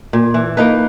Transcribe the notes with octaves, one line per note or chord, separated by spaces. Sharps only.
A#2
E3
A#3 D#4 B4